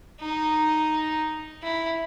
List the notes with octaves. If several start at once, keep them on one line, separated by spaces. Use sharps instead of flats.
D#4
E4